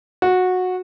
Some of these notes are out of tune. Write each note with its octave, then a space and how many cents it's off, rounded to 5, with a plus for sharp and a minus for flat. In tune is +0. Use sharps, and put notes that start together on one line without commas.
F#4 -15